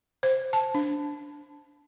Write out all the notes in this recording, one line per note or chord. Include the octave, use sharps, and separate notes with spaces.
C5
A5
D4